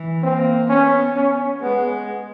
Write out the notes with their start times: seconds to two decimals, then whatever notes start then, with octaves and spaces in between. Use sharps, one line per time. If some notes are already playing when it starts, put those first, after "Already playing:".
Already playing: E3
0.23 A#3 C4
0.69 B3 C#4
1.15 C#4
1.61 G#3 B3